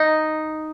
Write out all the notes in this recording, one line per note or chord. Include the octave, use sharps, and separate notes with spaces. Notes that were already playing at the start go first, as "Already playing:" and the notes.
Already playing: D#4